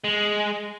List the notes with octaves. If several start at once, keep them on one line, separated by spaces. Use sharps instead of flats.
G#3